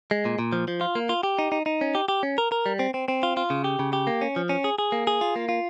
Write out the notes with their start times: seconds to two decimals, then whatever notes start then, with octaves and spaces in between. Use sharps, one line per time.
0.11 G#3
0.25 A#2
0.39 A#2
0.53 F3
0.68 F3
0.81 F4
0.95 A#3
1.09 F4
1.23 G4
1.39 D#4
1.52 D#4
1.66 D#4
1.81 C#4
1.95 G4
2.08 G4
2.23 C#4
2.38 A#4
2.52 A#4
2.66 G3
2.79 C4
2.94 C4
3.08 C4
3.23 F4
3.37 F4
3.50 C#3
3.64 G4
3.79 C#3
3.93 G4
4.07 A#3
4.21 C#4
4.36 F3
4.49 C#4
4.64 G#4
4.79 G#4
4.92 A#3
5.07 G#4
5.21 F4
5.36 A#3
5.49 F4